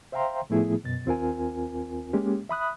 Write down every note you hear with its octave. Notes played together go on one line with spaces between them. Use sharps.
C5 E5 F5 G5 A#5 C6
A2 F3 A3 B3 E4 G#4
F#2 B2 A6
D#2 C4 F4 A#4 G#5
G#3 A#3 C#4 G4
E5 B5 D#6 F#6